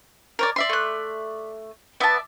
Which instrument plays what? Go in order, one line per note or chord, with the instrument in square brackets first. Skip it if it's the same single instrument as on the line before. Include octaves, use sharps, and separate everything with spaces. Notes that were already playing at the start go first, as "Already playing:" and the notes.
[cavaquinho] A#4 C#5 D5
D5 E5 C6
[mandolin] A3 F#6
[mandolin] B3 A5 [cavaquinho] D5 E5